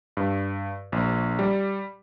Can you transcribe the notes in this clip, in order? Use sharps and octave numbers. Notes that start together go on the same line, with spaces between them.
G2
A#1
G3